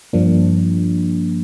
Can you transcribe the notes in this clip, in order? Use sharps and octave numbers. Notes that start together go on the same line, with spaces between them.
G2 F3 A#3 D4